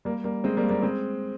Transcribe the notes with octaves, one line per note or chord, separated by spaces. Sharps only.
G3 A#3
G3 A#3
G#3 C4
G3 A#3
G3 A#3
G#3 C4